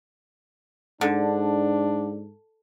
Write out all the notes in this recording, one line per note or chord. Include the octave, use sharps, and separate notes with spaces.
G#2 D3 D4